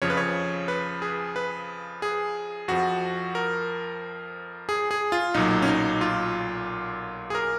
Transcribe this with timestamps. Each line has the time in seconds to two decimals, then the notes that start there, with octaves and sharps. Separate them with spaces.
0.02 F2 C#3 F3 C#5
0.10 B4
0.17 C#5
0.68 B4
1.02 G#4
1.36 B4
2.02 G#4
2.68 F2 F3 F#4
3.35 A#4
4.69 G#4
4.91 G#4
5.12 F4
5.34 B1 A#2 F#3 D#4
5.62 C#4
5.68 D#4
6.01 F4
7.30 G#4
7.35 A#4